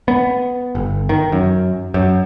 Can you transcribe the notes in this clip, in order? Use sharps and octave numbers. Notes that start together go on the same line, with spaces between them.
B3
G1
D#3
F#2
F#2